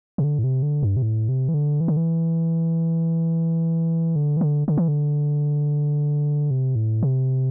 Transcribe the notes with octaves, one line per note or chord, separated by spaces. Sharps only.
C3
D3
A2
C3
D3
G2
C3
A2
C3
E3
D3
E3
D3
E3
D3
E3
D3
D3
E3
D3
C3
A2
C3